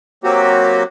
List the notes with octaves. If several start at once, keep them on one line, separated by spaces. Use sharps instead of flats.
F#3 A#3 C4 F#4 G4